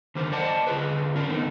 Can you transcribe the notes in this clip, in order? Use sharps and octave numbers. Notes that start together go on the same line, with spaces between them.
D3 D#3 G4 A#4 C5
C5 D5 D#5 F#5 G5 A5
D3 F4 G#4 B4
C#4 D4 A#4
D#3 A3 B3 C4 D#4